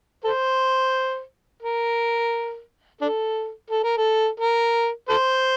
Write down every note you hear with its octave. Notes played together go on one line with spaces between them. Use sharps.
A4 C5
A#4
D4 A4
A4
A#4
A4
A#4
A4 C5